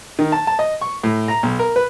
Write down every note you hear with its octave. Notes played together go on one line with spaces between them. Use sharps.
D#3
A5
A5
D#5
C#6
A2
A#5
B1
A#4
B4